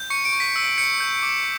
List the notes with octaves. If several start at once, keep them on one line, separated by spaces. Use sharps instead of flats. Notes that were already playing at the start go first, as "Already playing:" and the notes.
Already playing: G6
C#6 C#7
D7
C#6
B6
E6
G6 C#7
G6
D6